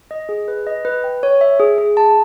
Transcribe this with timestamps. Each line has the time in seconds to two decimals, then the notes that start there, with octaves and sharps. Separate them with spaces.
0.11 D#5
0.29 G#4
0.48 B4
0.67 D#5
0.85 B4
1.04 G5
1.23 C#5
1.41 E5
1.60 G#4
1.78 G#4
1.97 A5